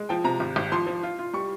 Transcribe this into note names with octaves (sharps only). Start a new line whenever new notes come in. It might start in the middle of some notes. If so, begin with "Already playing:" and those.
Already playing: G#3
F3 G5
C3 A#5
G#1
G#1
F3 C6
F3
F4
F4
G3 C#6